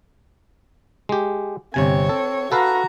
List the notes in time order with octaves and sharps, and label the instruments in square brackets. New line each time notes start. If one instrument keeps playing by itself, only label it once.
[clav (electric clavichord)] G#3 G4
[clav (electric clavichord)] G1 C3 G#5 [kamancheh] C4 C#5
[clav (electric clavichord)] A4
[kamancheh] F#4 A#5 [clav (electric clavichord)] A4 B4 F5